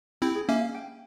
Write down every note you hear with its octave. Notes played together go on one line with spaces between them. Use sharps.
C4 E4 G4
G#4
A#3 C#4 E5
F5
G5